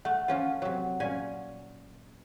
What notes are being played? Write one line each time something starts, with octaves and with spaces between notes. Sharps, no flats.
A3 F#5
F3 C#4 F4
C3 F#3
A#2 C#4 G#5